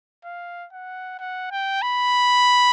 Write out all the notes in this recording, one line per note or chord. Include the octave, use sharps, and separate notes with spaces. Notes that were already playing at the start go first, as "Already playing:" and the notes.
F5
F#5
F#5
G5
B5